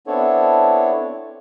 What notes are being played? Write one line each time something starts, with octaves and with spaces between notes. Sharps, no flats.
B3 C4 D4 E4 A4 C#5